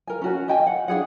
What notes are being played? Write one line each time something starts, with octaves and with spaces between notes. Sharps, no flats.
A#4 G#5
C#4 F#4 G#5
D#5 G5 G#5
F#5
D4 F#4 G#4 F#5